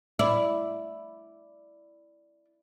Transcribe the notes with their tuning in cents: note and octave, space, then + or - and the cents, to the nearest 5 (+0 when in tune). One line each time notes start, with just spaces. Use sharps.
E4 +0 D5 +0